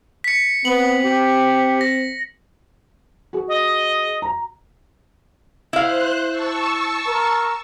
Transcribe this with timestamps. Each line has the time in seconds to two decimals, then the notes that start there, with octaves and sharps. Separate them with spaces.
0.24 B6 C#7
0.65 B3 C4 F#7
1.04 G4
1.81 A#6
3.33 F#4 G#4
3.48 D#5
4.22 A#5
5.73 E4 C5 F5 F#6
6.29 A5 C#6 E6
7.07 A#4